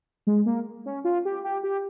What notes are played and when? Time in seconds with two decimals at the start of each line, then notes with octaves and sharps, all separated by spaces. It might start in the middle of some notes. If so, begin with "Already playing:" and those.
0.27 G#3
0.46 A#3
0.86 C#4
1.05 F4
1.25 G4
1.44 G4
1.63 G4